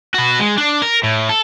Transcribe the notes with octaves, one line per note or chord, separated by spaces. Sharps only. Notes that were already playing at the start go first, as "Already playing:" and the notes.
F#4 B4
G#3
D4
A#4
A2
A4